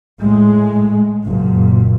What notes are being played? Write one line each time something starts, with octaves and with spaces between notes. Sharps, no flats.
A2 G#3
F#1 A#2